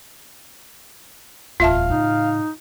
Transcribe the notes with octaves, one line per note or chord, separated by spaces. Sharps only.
D1 E2 F4 E5 F5 A5
A2 C#3 D#4